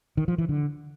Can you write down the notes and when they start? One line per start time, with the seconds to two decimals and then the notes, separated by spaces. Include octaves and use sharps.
0.17 D#3
0.28 F3
0.38 E3
0.49 D3